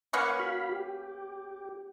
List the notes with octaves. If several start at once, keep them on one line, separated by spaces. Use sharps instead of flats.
A#3 B3 C#4 F5 F#5 C#6
F#4 F5 B5
G4